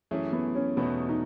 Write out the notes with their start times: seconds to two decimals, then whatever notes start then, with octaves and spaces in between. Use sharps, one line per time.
0.11 F#2 E3 A3 C#4 E4 G#4
0.33 B3
0.55 C#4
0.77 E2 B2 F#3 A3 B3 D#4
1.09 D#4